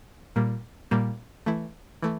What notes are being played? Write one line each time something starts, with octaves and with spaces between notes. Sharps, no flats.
A#2 G3 A#3
A#2 G3 A#3
E3 A3 E4
E3 A3